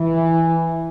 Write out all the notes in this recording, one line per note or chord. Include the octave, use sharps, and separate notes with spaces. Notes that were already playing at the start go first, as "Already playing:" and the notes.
Already playing: E3